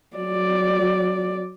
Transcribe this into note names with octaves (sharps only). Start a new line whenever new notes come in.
F#3 D5